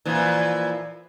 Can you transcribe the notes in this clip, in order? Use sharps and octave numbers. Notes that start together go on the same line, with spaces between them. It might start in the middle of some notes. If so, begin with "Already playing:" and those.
A#2 E3 F3